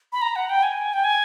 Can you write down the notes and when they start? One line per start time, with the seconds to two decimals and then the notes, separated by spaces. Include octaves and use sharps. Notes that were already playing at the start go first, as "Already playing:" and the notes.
0.13 B5
0.22 A#5
0.36 F#5
0.49 G5
0.63 G#5
0.93 G5
1.04 G#5